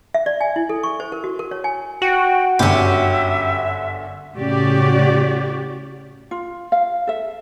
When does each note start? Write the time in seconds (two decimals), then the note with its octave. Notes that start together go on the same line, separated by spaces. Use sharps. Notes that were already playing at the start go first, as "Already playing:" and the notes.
0.14 E5
0.26 D5
0.41 G#5
0.56 E4
0.69 A4
0.83 C#6
1.00 C5
1.12 A#4
1.24 F#4
1.39 A#4
1.51 C#5
1.64 G#5
2.02 F#4 G5
2.59 G1 F#2 D3 C#4 G4 E5
4.36 A2 C#3 F#4 G4 D5
6.31 F4
6.72 F5
7.07 A4 E5